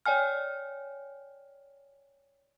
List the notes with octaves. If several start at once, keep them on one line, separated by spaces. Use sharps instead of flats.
C#5 D5 G5 G#5 F6